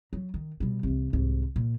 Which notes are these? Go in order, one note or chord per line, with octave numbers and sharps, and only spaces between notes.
F#3
D#3
B2 G3
C2 E3
C2 G#2
A#2